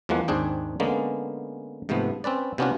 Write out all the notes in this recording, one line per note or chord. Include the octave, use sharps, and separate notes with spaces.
E2 F3 G#3 A#3 F#5
D#2 G#2 C4 D4 G#4 G5
D3 G#3 A#3 B3 C#4
G#2 C3 F3 A3 B3
C4 C#4 B4 D5
C3 B3 C#4 D4 F4 F#4